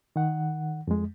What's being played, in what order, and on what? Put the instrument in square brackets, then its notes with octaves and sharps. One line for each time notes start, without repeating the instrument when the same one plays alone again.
[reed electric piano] D#3 F#5
F2 G#3